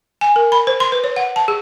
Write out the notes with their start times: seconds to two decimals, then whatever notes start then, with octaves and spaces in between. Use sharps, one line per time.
0.21 G#5
0.36 A#4
0.52 B5
0.67 C5
0.80 C6
0.92 B4
1.04 C#5
1.16 F#5
1.36 A5
1.48 G#4